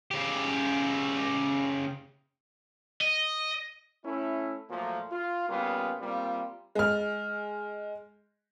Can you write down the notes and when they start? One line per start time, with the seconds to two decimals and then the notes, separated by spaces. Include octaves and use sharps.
0.11 C#3 G4
3.01 D#5
4.04 A3 C#4 E4
4.69 A#2 F3 F#3 A3 A#3
5.11 F4
5.49 C#3 G3 A#3 B3 F4
6.00 G3 A#3 C4 F4
6.75 G#3 F6